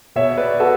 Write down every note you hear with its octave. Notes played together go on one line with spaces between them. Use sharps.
B2 C#5 E5
B4 D5
F#4 A4